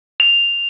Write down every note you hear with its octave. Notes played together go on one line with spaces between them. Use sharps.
F7